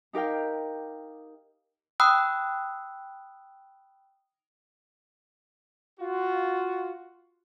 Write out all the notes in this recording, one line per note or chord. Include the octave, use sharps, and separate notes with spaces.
D#4 G4 A#4 F5 G5
G5 B5 D#6 E6 F#6
F4 F#4